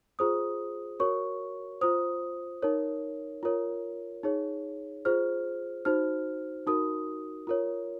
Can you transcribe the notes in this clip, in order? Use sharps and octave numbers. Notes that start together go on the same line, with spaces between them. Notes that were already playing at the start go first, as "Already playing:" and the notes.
F4 G#4 C5 D#6
F#4 A#4 C#5 C#6
F4 C5 D#6
D#4 A#4 C#5
F4 A#4 C#5
D#4 G#4 C#5
F4 G#4 C5 F6
D#4 F#4 C5 F6
D#4 F#4 A#4 D#6
F4 A#4 C#5